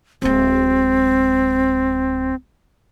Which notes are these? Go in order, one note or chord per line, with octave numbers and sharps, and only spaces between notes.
D1 G#3 C4